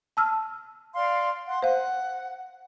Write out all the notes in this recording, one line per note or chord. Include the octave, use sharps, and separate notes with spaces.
A5 E6 F6
D5 F5 C6
F#5 C6
C5 F5 F#5